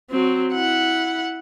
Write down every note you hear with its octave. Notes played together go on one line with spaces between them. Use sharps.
F#3 C4
E4 F#5